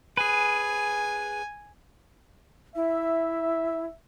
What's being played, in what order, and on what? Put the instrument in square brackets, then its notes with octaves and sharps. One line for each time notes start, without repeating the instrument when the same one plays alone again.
[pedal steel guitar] G#4 B4 [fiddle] G#5
[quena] E4 [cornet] E5